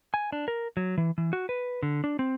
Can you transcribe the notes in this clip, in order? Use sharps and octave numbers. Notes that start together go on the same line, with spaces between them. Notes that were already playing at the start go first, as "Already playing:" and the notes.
G#5
D4
A#4
F#3
E3
E3
F#4
B4
D3
D4
C4